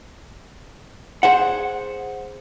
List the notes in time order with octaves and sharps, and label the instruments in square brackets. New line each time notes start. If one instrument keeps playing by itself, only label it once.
[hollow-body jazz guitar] G#4 C5 F#5